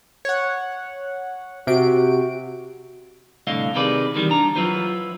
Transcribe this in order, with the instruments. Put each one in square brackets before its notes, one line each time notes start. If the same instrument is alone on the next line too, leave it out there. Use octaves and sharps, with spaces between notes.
[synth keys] C#5 F#5
[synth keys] C3 D7 [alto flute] F#4
[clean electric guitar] C2 A2 D3 D#5 F5
C3 D#3 G#4 B4 D5 B5
C3 D#3 E3 G3
D4 A#5
F#3 E4 F4 B4 C5